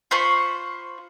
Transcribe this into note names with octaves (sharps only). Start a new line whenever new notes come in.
F4 C5 B5 C#6